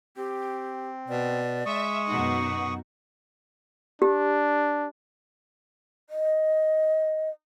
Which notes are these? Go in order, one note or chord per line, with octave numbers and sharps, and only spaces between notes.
C4 G4
B2 D5
G#3 E5 C#6 D#6
F#2 B2 D#4 F#4
D4 G4
D#5